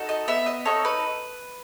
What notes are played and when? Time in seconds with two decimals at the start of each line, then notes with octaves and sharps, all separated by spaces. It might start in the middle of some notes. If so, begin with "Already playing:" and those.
Already playing: D#4 F#4 A4
0.09 D#5
0.28 B3 E5
0.46 D#5
0.65 D#4 F#4 A4 C#5
0.85 B4